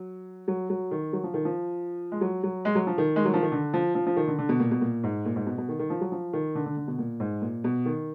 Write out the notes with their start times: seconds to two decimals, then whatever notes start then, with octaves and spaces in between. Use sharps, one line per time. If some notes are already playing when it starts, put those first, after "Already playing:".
Already playing: F#3
0.48 F#3
0.70 F#3
0.91 D#3
1.13 F#3
1.24 F3
1.34 D#3
1.45 F3
2.12 G#3
2.21 F#3
2.44 F#3
2.65 G#3
2.75 F#3
2.87 F3
2.98 D#3
3.16 G#3
3.25 F#3
3.33 F3
3.42 D#3
3.52 D3
3.74 F3
3.95 F3
4.06 F3
4.16 D#3
4.27 D3
4.39 D3
4.49 B2
4.60 A#2
4.71 B2
4.81 A#2
5.04 G#2
5.25 A#2
5.36 G#2
5.47 B2
5.58 B2
5.69 D#3
5.79 D#3
5.90 F3
6.01 F#3
6.12 F3
6.33 D#3
6.55 D3
6.66 D3
6.77 D3
6.88 B2
6.99 A#2
7.20 G#2
7.42 A#2
7.64 B2
7.86 D#3